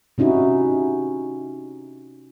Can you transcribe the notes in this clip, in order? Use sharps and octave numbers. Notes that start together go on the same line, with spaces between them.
C3 C#4 D#4 E4 F#4